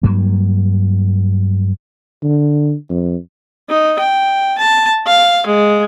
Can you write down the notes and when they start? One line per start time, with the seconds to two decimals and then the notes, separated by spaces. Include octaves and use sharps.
0.03 G2 F#3 A#3
2.23 D3
2.90 F2
3.69 D#4
3.99 G5
4.58 A5
5.07 F5
5.46 G#3